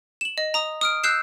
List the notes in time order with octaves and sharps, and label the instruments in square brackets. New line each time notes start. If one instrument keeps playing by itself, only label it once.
[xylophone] E7 F#7
D#5
A#5 D#6
D#6 F6 D7
E6 F#6 G6 C7 E7